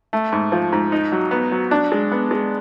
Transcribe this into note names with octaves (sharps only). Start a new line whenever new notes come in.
A3
G#2
F3
G#2
D#4
F#3
B3
F#3
D4
G#3
B3
G#3